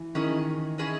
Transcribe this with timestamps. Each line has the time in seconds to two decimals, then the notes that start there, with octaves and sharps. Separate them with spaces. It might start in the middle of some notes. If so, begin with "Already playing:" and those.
Already playing: E3
0.15 D#3 C#4 E4 G#4 D#5
0.78 C#4 E4 G#4 D#5